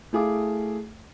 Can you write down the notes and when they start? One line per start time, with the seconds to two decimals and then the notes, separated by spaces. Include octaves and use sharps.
0.13 A3 E4 G#4 F5 D6